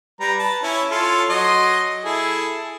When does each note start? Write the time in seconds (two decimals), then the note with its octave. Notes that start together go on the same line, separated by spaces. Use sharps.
0.20 G3 B4 A#5
0.39 B4 A5
0.63 C#4 E4
0.91 F4 A4 C#5
1.30 F#3 D#5 C6
2.04 E4 G#4 A4